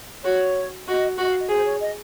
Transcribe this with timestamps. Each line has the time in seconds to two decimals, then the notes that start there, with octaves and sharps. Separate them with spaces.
0.25 F#4 C#5
0.87 F#4 D#5
1.18 F#4 D#5
1.28 F5
1.39 D#5
1.49 G#4 C5
1.65 C#5
1.81 D#5